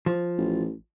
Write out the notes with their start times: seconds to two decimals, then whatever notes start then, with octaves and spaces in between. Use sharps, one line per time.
0.06 F3
0.38 A1